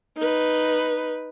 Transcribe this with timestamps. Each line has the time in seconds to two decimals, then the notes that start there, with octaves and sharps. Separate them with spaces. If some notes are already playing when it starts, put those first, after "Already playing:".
0.18 D#4 B4